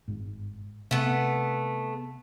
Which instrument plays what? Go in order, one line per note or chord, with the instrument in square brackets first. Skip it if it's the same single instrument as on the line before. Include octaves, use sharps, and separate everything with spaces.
[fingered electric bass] G1 G#2
[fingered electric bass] C3 [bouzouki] A3 B3